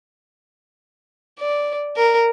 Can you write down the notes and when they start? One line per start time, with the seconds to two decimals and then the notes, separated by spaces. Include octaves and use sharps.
1.39 D5
1.96 A#4